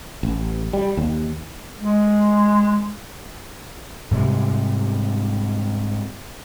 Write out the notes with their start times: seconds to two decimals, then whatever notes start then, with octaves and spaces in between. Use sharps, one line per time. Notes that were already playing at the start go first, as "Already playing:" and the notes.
0.23 A1
0.73 G3
0.97 D#2
1.77 G#3
4.11 G#2 C3 G3 G#3